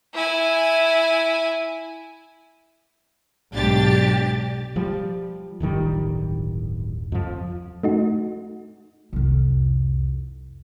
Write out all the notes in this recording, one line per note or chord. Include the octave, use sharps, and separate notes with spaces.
E4 G#5
B1 G#2 D4 G4 A6
F3 G3
D1 G1 D#3 G3
F2 F3
A3 D#4 F#4
C2 F2